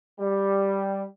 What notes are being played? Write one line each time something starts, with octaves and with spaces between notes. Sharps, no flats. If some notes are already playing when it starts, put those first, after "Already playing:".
G3